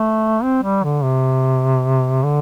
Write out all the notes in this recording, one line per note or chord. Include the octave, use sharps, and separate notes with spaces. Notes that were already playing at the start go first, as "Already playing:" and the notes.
Already playing: A3
C4
G3
D3
C3
D3